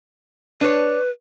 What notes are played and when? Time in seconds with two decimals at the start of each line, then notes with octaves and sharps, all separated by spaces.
0.61 D4 B4 C#5